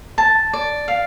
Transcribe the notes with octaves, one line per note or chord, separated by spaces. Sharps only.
A5
D5
F5